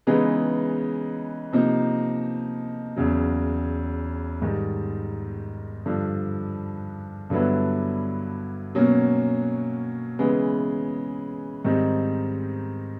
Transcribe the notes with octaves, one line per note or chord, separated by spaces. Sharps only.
C#3 E3 G#3 B3 D#4
C3 F3 A#3 D#4
E2 C#3 F#3
G#2 D#3 G3
G2 D3 F3
G2 D3 F#3 B3 E4
B2 F#3 A#3 C#4
C#3 E3 G#3 B3
G#2 D#3 G3 C4 D#4